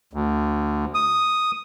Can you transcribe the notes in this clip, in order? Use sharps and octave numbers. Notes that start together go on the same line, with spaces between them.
D2
D#6